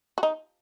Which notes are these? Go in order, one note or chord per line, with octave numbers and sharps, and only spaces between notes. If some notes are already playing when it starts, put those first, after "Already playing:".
F#4
D#4